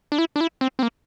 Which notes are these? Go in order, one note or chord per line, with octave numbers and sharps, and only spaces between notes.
D4
E4
D4
E4
C4
C4
A#3